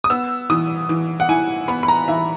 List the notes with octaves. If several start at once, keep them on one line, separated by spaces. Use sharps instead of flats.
D#6
B3 E6
E3 D#6
E3
F#5
E4 G#5
B3 B5
B5
A#5
E3 E5